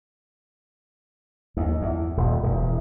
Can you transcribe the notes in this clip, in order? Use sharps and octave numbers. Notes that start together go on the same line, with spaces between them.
D#2
E2
D#1
E1